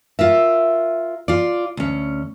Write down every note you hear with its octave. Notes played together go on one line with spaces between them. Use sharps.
F4 A#4 E5
F4 D5
D2 C#4